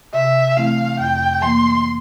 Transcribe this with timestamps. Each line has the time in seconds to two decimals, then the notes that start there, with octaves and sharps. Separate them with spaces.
0.14 C3 E5
0.57 E3 A3 C4 E4 F5
0.99 F2 G5
1.42 E3 A#3 C6